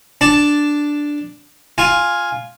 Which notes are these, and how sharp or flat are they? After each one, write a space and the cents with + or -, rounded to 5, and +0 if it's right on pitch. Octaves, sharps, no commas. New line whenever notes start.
D4 +0 A5 +0
F4 +5 G#5 +0